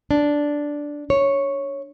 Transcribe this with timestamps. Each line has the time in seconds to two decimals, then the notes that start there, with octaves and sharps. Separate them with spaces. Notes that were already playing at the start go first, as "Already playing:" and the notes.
0.11 D4
1.10 C#5